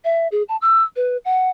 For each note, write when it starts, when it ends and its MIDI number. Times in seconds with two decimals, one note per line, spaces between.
0.04 0.28 76
0.32 0.43 68
0.49 0.56 81
0.61 0.83 88
0.96 1.17 71
1.25 1.50 78